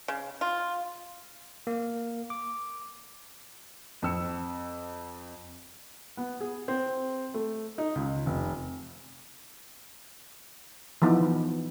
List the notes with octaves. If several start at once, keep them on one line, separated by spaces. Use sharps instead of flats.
C#3
F4
A#3
D6
F2 C4 E6 C#7
B3
G#4
C4
A3
D#4
C#2
F1
E3 F3 B3 D#4